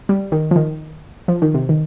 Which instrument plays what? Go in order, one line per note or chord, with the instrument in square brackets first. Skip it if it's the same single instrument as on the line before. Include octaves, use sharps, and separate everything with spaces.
[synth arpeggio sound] G3
D#3
F3
D#3
F3
D#3
C3
D#3